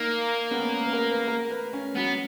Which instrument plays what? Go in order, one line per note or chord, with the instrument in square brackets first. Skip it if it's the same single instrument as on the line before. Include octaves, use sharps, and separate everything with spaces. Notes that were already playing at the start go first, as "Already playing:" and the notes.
Already playing: [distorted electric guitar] A#3 [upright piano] D#4
[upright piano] B3
C#4
B4
A#4
B4
A#4
B4
C#4
[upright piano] F#3 [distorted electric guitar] B3